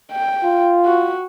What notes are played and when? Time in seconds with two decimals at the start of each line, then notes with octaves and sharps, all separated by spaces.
0.12 G5
0.44 F4
0.85 F#4